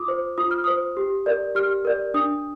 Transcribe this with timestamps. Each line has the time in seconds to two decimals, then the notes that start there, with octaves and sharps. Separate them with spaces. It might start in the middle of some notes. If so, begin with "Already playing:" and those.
Already playing: F4 D6 D#6
0.08 C5
0.38 F4 D#6
0.51 F6
0.64 C5 D#6
0.97 G4
1.26 A#4 D5
1.55 G4 F6
1.85 A#4 D5
2.14 D4 D#6